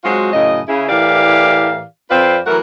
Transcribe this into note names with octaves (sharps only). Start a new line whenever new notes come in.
F#3 G#3 C4 F4 F#4
F#2 A2 C#3 D#5
C#3 E4
A2 E3 G4 A#4 D5 F5
F2 C4 F4 B4 D5 F5
E3 F#3 A3 F#4 A#4